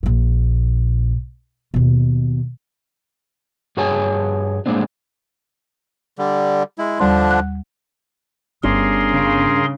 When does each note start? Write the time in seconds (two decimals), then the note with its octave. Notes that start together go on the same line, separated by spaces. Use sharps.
0.03 A#1 A#2
1.74 D#2 B2
3.77 G2 F#4 G#4 C#5 G#5 A5
4.66 A2 G#3 A#3 C4 D4
6.19 D3 G3
6.78 G#3 E4
7.00 D#2 D3 F3 G3 D4 C6
7.31 F#5 F#6
8.63 G1 G2 B3 C#4 G#4 A#4 C6
9.11 C#3